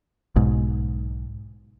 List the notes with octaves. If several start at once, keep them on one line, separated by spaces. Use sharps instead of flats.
B1 G#2